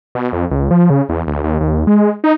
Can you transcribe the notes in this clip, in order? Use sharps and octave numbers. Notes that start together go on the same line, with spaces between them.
B2
F2
C#2
F3
C#3
E2
D2
D#2
D#2
G#3
D#4